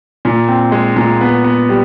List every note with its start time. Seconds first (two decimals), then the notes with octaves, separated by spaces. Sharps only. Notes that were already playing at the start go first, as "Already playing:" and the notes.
0.25 A#2
0.48 C4
0.72 G#3
0.96 A#2
1.21 B3
1.44 B3
1.69 G3